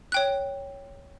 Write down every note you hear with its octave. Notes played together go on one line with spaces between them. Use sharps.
C#5 G5 F#6